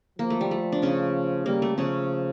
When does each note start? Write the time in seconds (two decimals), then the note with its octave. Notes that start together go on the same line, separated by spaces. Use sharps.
0.19 F3 A#3
0.30 A3
0.41 G3
0.51 A3
0.72 D4
0.82 C#3 C#4
1.46 G3 A#3
1.62 A3
1.78 C#3 F3 C#4